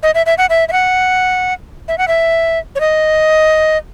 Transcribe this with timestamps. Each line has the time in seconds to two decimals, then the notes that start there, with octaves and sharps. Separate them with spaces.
0.03 D#5
0.15 E5
0.26 E5
0.38 F#5
0.50 E5
0.69 E5
0.72 F#5
1.88 E5
1.98 F#5
2.08 E5
2.75 C#5
2.80 D#5